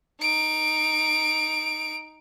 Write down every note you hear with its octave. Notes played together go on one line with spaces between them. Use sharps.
D#4 D7